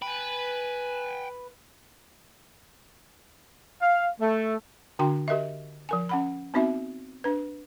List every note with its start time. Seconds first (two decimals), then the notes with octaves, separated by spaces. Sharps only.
0.02 B4 G5 G#5
3.82 F5
4.21 A3
4.99 D3 D4 F#4 G5 C6
5.28 G4 A#4 D#5 E5
5.89 F3 A#4 G#5
6.09 C#4 F#5 B5
6.54 B3 C4 D#4 F#4 E5
7.24 D4 B4